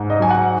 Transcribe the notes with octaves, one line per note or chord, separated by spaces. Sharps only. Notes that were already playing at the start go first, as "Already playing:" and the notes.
Already playing: G#2
D#5
F#3 G#5
F#5